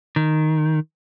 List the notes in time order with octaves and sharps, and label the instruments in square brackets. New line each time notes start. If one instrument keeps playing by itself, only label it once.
[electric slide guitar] D#3